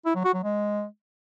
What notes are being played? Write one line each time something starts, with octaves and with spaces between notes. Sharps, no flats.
E4
F#3
F#4
F#3
G#3